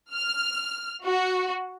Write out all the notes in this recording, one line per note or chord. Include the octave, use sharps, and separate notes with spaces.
F6
F#4